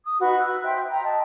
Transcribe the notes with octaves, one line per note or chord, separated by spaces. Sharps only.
D#6
D#4 F#4 B4 B5
E6 F#6
C5 E5 G5
G5 A#5
D#5 A5